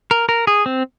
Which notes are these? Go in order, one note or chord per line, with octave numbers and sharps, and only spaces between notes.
A#4
A#4
G#4
C4